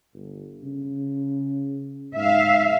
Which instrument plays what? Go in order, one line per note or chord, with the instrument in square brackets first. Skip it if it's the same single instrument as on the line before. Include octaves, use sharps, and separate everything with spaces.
[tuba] G1
C#3
[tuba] G#2 [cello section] E5 F5